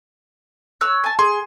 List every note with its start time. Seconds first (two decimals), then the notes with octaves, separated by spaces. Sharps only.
0.81 C#5 E6 F#6
1.04 G#5 A5
1.19 G#4 C6